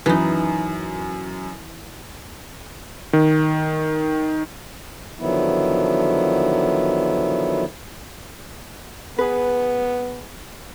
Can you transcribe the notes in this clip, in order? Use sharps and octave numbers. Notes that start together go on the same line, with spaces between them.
F#2 E3 D#4
D#3
D3 D#3 F3 F#3 B3 E4
B3 G#4 B4